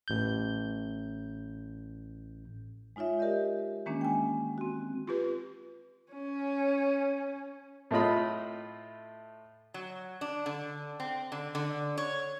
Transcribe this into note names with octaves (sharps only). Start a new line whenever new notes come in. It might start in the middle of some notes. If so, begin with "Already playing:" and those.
A1 G6
G#3 D#4 F4 C#5 E5
G4 A#4 D5 D#5 G6
D#3 E3 G#3 A#3 C#4 D4
G5 G#5
C4 F#4
F4 G4 B4
C#4
A2 A3 F4 D#5 B5
F#3
D4
D3
C4
D3
D3
C#5